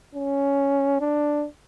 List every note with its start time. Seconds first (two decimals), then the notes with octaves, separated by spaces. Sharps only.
0.15 C#4
1.01 D4